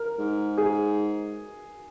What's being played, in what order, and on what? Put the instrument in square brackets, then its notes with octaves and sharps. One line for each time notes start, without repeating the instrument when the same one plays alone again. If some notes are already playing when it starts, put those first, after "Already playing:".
Already playing: [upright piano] A#4
[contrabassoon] G#2
[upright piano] G#4